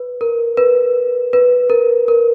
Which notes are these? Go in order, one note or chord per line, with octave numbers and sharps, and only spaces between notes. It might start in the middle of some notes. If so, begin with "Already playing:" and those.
Already playing: B4
A#4
B4
B4
A#4
A#4